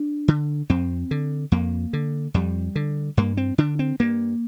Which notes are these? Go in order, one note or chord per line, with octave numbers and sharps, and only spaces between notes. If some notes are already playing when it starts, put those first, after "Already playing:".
Already playing: D4
D3
F2 C4
D3
F2 A#3
D3
F2 G3
D3
G2 A#3
C4
D3 D4
C4
G2 A#3